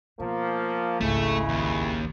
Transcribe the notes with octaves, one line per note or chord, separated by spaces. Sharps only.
B2 F3 A#3
G#1 C#2 C#3 G#3 A3 E4
D#2